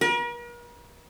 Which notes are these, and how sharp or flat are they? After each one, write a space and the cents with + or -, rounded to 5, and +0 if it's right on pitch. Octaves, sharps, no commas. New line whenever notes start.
A#4 +45